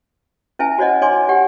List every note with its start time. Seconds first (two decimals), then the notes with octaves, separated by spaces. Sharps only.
0.59 C#4 E4 B4 E5 G#5 A5
0.78 F#4 C5 C#5 D#5 F#5
1.01 D#4 C#5 G#5 C6 D6
1.29 G4 C#5 F#5 G5